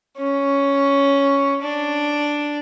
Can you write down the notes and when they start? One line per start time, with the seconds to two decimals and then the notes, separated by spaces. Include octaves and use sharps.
0.17 C#4
1.62 D4